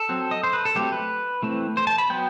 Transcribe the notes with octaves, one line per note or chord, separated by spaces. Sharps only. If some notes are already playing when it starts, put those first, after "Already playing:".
Already playing: A4
F#3 C4
D#5
C5
B4
A4
F#3 A3 C4 G4
B4
E3 A3 C4
C5
A5
B5
F#3 B3 G5